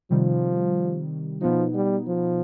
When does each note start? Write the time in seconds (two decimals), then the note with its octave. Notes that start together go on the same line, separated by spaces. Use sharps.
0.10 C3 D#3 F3 G3
1.41 B2 F3 B3 D#4
1.74 G3
2.07 F3